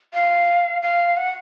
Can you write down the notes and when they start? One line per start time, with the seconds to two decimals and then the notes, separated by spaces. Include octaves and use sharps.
0.14 F5
0.82 F5
1.17 F#5